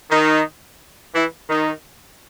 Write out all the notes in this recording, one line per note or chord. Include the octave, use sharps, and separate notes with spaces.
D#3 D#4
E3 E4
D#3 D#4